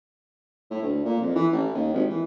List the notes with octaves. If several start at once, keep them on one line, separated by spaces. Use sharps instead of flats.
A2
D2
A#2
F2
E3
A1
D#2
G#1
E3